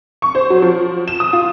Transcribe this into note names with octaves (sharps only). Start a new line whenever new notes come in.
C#6
C5
F#3
F3
E7
D#6
F4